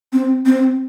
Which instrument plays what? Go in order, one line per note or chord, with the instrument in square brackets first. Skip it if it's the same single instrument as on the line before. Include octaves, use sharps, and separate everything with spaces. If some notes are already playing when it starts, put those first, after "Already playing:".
[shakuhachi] C4
C4